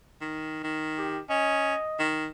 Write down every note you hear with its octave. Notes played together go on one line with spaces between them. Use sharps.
D#3
D#3
G4
C#4 D#5
D#3